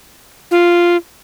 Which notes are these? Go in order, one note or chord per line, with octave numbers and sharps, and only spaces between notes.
F4